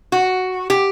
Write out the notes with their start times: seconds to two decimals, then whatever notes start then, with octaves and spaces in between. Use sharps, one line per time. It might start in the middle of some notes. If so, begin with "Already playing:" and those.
0.12 F#4
0.70 G4